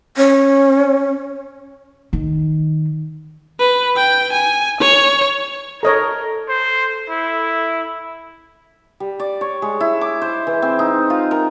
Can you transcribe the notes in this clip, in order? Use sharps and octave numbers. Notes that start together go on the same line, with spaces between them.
C#4
D#3
B4
G5
G#5
C#5
A4 A#4 C#5 D#5 A#5
C5
E4
G3
D5
C#5
G#3
E4
D6
C5
E3
C4
D#4
F4
A#4